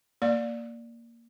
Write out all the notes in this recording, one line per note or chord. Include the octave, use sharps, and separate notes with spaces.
A#3 D5